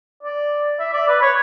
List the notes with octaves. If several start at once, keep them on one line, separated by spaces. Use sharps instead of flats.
D5
E5
D5
B4
C#5